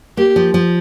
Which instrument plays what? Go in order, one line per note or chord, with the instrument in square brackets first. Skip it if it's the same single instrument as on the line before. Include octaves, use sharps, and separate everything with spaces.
[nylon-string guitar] A#3 [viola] G4
[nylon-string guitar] F3
F3